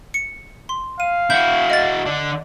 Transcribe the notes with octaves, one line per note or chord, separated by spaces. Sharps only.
C#7
C6
F5 D#7
E4 F#4 G6
D#5 A6
D3